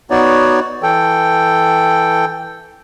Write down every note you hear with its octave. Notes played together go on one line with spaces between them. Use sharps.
B3 D#4 F#4 C#5 D5
E3 A4 G5